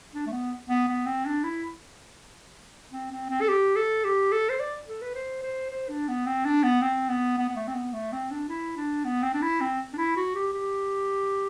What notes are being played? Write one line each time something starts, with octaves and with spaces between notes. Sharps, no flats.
D4
A3
B3
B3
B3
C4
D4
E4
C4
C4
C4
A4
G4
A4
G4
A4
C5
D5
A4
B4
C5
C5
C5
D4
B3
C4
D4
B3
C4
B3
B3
B3
A3
C4
B3
A3
C4
D4
E4
D4
B3
C4
D4
E4
C4
D4
E4
F#4
G4
G4